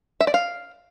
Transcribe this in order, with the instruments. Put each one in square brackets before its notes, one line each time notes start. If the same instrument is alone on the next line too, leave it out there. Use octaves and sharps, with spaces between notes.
[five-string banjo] E5
D5
F5